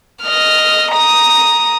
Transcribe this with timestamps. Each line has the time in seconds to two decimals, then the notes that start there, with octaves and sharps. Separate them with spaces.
0.23 D#5 F6
0.91 A#5 D#6